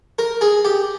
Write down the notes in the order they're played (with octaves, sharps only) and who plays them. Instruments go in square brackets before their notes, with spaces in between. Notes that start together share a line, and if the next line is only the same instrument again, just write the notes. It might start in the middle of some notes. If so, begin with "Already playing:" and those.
[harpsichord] A#4
G#4
G4